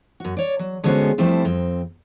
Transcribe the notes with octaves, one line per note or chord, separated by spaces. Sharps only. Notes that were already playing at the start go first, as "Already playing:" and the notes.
F#2 F#4
C#5 D5
F#3
D3 G#3 B3 C#4 F#4 C5
F3 G3 A3 C4 E4 A4
F2 C4